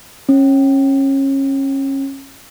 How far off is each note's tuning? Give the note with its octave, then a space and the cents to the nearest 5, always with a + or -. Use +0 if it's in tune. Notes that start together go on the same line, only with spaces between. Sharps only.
C#4 -25